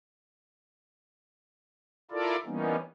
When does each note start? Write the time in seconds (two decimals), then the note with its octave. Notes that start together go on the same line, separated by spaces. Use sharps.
2.11 E4 F4 A4 A#4 D5
2.46 E3 G3 A#3 B3 C#4 D#4